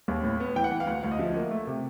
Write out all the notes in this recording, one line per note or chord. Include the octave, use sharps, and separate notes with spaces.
D#2
A2
B3
E3 G5
F#5
E3 G5
F5
D2 F#5
D2 F5
D#5
F3 E5
A#3
A3
C3